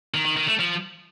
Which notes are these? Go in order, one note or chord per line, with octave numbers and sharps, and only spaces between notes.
D#3
D#3
D#3
A3
F3